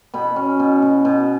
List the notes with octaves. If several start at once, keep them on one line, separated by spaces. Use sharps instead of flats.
B2 B5
C#4
B2
B2
B2